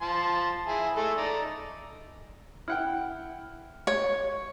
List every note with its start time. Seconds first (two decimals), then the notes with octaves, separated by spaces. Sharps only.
0.02 F3 A5 C6
0.68 E4 G#4
0.97 G#3 A3 A4
1.17 D#4 D5
2.68 E4 F#5 G5 F6
3.87 C#5